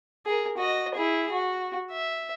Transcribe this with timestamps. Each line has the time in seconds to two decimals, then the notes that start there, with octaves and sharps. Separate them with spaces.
0.26 G#4 A#4
0.57 F#4 D#5
0.95 E4 G#4
1.32 F#4
1.91 E5